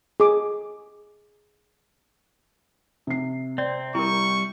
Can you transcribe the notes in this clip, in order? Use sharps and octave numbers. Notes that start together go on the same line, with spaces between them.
G#4 D6
C3 C7
C4 D5
G3 E4 A#4 C#6